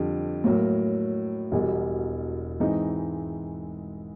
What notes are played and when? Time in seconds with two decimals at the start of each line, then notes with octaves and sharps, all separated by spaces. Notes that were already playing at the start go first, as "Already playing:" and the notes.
Already playing: F2 D3 G3
0.44 A2 F#3 A#3
1.52 E1 E2 B2 G3
2.60 G#2 E3 G#3 C4 D#4